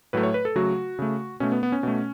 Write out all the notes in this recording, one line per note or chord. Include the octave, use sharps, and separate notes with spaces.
A2 F#3 A3 B4
C#5
B4
A4
C#3 F#3 A3 F#4
C#3 A3
B2 A3 C#4
B3
B3
C#4
B2 A3